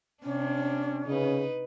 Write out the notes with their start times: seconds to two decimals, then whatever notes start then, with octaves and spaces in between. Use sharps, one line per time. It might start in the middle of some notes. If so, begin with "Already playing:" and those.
0.23 C3 C#4 D4
1.07 C#3 D#4 B4